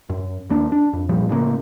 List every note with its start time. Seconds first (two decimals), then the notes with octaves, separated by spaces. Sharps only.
0.10 F#2
0.50 D#2 A#3 D4
0.72 D4
0.93 F2
1.09 C2 A#2 F3 G3
1.29 A2 C#3 G#3 A#3